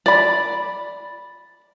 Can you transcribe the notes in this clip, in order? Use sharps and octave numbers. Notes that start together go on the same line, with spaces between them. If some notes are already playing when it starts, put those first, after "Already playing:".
D5 B5